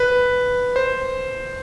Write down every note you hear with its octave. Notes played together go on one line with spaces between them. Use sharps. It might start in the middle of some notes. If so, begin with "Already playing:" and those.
Already playing: B4
C5